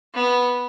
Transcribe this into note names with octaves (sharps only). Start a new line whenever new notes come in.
B3